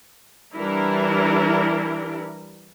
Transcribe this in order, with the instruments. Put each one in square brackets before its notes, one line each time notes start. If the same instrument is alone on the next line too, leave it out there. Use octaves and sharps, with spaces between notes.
[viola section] E3 G3 D4 E4 A#4